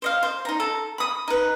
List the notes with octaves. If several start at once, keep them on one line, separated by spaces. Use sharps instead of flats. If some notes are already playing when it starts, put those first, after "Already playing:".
C5 D#5 F5
C5
D#4 A#5
A4
B5 D#6
D#4 B4